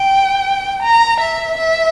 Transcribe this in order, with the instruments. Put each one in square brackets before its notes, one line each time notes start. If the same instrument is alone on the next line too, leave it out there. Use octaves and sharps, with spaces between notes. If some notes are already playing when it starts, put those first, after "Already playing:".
Already playing: [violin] G5
A#5
E5
E5